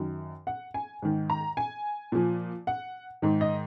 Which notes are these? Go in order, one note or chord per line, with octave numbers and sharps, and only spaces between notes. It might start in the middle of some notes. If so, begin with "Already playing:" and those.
Already playing: F#2 D#3
F#5
G#5
G#2 D#3
A#5
G#5
A#2 F3
F#5
G#2 D#3
D#5